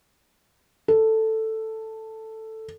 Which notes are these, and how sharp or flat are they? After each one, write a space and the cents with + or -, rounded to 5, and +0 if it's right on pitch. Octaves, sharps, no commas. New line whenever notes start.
A4 +5